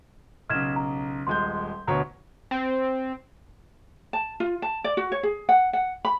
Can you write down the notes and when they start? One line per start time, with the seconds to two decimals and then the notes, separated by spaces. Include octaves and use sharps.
0.50 B1 C#3 F6 G#6 E7
0.76 A#5
1.27 D#1 G#3 C6 G6
1.87 D2 B2 C#5 A#5
2.51 C4
4.13 A5
4.40 F4
4.62 A5
4.84 D5
4.97 F#4
5.12 C#5
5.23 G#4
5.49 F#5
5.73 F#5
6.05 B5